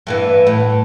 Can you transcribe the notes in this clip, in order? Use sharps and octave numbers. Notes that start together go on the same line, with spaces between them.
G2 E3 B3
A2